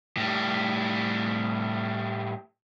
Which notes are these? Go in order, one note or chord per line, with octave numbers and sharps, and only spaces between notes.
A2 G3